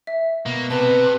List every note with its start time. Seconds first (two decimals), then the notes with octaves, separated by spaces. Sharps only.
0.07 E5
0.46 B2 A#3
0.70 C3 B4 A5